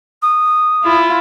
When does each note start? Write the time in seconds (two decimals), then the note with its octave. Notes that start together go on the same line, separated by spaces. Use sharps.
0.22 D#6
0.84 E4 F4